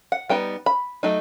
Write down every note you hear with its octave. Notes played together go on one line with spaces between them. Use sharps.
F#5
G3 B3 D#4 G5
B5
F#3 A3 D#4